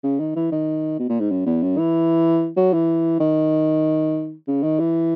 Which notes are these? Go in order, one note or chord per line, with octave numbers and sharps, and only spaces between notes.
C#3
D#3
E3
D#3
B2
A#2
G#2
F#2
E2
F#2
E3
F#3
E3
D#3
C#3
D#3
E3